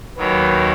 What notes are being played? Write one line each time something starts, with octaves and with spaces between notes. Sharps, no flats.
D#2 D#3 F#3 B4